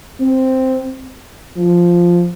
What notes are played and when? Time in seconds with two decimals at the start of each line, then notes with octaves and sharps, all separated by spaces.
0.20 C4
1.57 F3